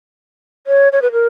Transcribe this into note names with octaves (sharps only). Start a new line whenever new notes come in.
C#5
C#5
B4
A#4